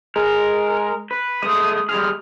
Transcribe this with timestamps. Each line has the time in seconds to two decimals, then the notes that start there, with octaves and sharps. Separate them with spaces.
0.16 G#3 A#4
1.11 B4
1.42 G#3 A3 D#6
1.89 G3 G#3 G#4 F6